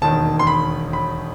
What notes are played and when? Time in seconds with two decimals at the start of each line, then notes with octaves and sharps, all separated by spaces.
0.02 E1 D#2 D#3 A5
0.39 C6
0.47 B5
0.93 B5